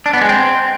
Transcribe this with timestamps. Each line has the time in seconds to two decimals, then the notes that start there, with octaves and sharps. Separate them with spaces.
0.06 D4
0.13 B3
0.21 G#3
0.29 C4